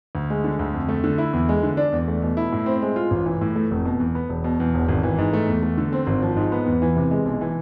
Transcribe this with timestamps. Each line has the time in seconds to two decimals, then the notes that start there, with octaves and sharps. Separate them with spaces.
0.15 D2
0.30 G#3
0.44 D3
0.59 D2
0.74 F2
0.89 A3
1.04 D3
1.18 E4
1.33 E2
1.49 G#3
1.63 D3
1.77 D4
1.92 E2
2.08 A3
2.22 B2
2.37 E4
2.52 A2
2.66 C4
2.82 G#3
2.96 F4
3.11 A1
3.26 E3
3.41 A2
3.56 A3
3.71 F1
3.85 B2
4.00 E2
4.15 B3
4.29 E1
4.44 B2
4.60 E2
4.74 E1
4.88 G#1
5.03 E3
5.18 G#2
5.33 A3
5.48 E2
5.63 A3
5.78 D3
5.93 C4
6.07 G#1
6.22 F3
6.36 G#2
6.52 B3
6.66 E2
6.82 E3
6.96 C3
7.11 G#3
7.25 B1
7.41 E3